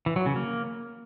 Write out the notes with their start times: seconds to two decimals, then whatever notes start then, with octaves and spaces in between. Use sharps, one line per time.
0.06 E3
0.16 F#3
0.26 C#3
0.36 A#3